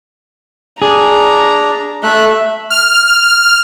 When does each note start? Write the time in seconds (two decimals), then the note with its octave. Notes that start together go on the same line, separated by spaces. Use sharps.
0.82 D4 G#4 A#5
2.03 A3 E5 F#6
2.70 F6